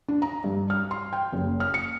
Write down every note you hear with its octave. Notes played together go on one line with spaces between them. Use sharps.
D4
A#5
G2
F6
C6
G5
F#1
F6
C#7